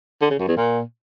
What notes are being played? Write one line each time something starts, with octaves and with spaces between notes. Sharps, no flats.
D3
C#3
F#2
E2
A#2